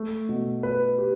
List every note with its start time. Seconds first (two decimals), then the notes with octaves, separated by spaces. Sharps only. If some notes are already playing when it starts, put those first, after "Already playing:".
Already playing: A3
0.29 B2
0.63 B4
0.98 G4